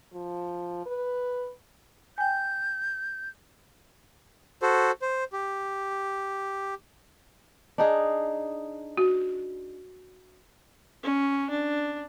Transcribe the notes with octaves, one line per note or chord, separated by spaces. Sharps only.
F3
B4
G5 G#5 G6
F#4 A4 C5
C5
G4
D4 D#4 G#4
F#4
C#4
D4